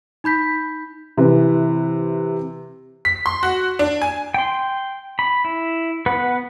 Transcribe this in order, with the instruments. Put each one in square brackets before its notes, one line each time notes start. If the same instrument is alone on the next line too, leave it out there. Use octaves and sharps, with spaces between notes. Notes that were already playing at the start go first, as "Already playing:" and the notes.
[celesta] D#4 B5 G6 B6
[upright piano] C3 E3 B4
[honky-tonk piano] B6
C6
F#4
D4
G#5
[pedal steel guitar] G5 C6
B5
E4
B3 B4 F#5